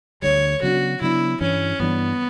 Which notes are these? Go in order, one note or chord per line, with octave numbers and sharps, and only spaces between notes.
D2 D3 G3 C#5
C#3 F#3 B3 D4 F#4
C#3 F#3 B3 D4 E4
G2 E3 G3 C#4 D4
G2 E3 G3 B3 D4